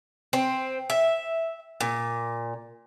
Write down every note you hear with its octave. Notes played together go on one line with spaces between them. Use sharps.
C4
E5
A#2